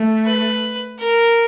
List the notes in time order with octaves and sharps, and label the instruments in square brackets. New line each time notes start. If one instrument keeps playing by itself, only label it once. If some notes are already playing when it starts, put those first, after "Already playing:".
Already playing: [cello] A3
[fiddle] B4
A#4